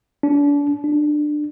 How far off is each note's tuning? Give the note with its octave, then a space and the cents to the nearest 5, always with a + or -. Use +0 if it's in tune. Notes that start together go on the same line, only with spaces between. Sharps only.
D4 -35
D4 +20